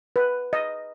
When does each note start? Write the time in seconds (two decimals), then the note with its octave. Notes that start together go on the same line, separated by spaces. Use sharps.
0.16 B4
0.53 D#5